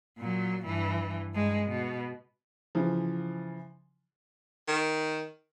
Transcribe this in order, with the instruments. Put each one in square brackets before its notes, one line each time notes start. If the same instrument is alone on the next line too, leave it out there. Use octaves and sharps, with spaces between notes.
[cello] A#2 F#3
G2 E3
G2 G#3
B2
[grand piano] C#3 E3 F3
[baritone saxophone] D#3